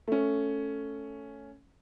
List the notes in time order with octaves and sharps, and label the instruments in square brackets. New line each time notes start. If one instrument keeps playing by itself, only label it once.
[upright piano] A3 C#4